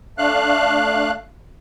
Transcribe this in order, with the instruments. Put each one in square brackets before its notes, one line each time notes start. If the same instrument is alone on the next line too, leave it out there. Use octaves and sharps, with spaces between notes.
[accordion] A3 D4 F5 F#6